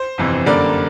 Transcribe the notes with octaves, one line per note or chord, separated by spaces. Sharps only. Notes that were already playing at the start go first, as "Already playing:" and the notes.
Already playing: C5
G1 F2 C3 E3
F#2 D3 G3 A#3 D5